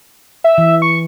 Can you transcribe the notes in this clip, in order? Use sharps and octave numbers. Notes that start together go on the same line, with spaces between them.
E5
E3
C#6